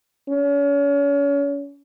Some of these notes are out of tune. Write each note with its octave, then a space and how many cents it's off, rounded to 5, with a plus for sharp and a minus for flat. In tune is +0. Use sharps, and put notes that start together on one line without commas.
C#4 +35